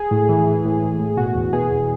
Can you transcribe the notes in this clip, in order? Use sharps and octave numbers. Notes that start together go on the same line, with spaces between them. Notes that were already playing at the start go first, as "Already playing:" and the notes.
Already playing: G#4
A2
E3
E3
A2
A2
A2
B2 F#4
E2
B2 G#4
E2